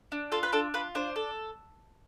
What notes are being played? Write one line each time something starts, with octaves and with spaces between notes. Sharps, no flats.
D4
F4 A4
B4
D4 A4
F4 B4
D4 C5
A4